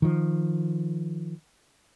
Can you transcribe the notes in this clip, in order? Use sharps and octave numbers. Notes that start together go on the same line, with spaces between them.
D#3 F3